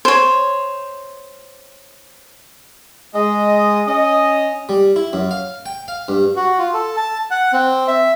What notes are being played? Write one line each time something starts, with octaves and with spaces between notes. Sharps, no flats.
C5 C#5
G#3 D#5
C#4 D#5
G3
E4
F#2
F5
G5
F5
G2
F#4
F4
A4
A5
F#5
C4
E5